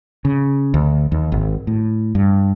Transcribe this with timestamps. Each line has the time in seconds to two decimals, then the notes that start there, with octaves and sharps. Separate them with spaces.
0.25 C#3
0.74 D2
1.12 D#2
1.32 G#1
1.67 A2
2.15 G2